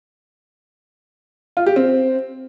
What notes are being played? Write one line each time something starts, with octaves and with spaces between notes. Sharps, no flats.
F4
G4
C4